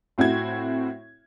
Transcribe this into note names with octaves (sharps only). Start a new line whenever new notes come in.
A2 C4 E4 F#4 G#6